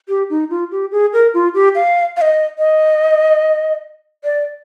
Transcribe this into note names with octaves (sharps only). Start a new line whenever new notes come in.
G4
D#4
F4
G4
G#4
A#4
F4
G4
F5
F5
D#5
D#5
D5